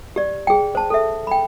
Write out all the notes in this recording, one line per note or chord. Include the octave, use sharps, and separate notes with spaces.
G4 D5
G#4 G5
C5 A5
A4 E5
G5 B5